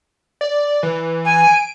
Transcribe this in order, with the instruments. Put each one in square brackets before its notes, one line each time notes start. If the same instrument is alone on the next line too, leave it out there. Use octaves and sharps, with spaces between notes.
[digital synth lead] D5
E3
[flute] G#5
[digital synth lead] D7